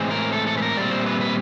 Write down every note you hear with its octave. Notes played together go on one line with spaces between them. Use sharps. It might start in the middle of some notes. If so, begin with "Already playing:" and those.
Already playing: A2 E3 G#3 C4
A#4
A4
A4
B4
A#4
A#2 G3 C4 D5
C5
B4
B4